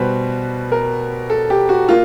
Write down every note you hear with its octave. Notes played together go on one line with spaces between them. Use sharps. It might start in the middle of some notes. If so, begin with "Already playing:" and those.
Already playing: B2 G3 B3 F#4 B4 C5
A#4
A4
G4
F#4
A#3 F4